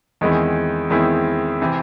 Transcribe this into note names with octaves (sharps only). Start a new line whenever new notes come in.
E2 D#3 G#3 C4 E4
E2 D#3 G#3 C4 E4
C3 E3 C4